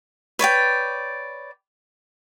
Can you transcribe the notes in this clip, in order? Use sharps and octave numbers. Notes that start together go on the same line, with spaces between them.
B4 C#5 D5 G5